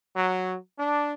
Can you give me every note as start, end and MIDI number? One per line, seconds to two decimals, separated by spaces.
0.16 0.55 54
0.79 1.13 62